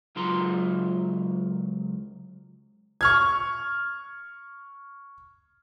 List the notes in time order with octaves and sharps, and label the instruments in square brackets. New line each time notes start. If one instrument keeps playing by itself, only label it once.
[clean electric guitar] C#2 F#3 F4 A#5 C6
[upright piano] C#6 F6 G#6